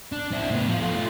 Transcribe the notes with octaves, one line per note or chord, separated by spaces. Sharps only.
D4
C4 E4
A2 B3
F3 F4
A3 F4